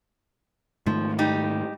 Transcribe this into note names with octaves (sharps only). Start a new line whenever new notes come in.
G#2 D#3 F3 A3
G3 D#4 G4